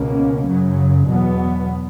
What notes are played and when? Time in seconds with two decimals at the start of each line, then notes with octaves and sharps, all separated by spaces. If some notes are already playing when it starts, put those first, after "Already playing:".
Already playing: C#2 B2 A#3 C#4
0.47 F#2 C#3 F#3
1.06 E2 B2 F#3 B3